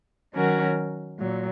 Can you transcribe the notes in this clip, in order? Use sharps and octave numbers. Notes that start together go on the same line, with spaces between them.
D#3 F#3 C#4 F#4 A#4
A#2 F#3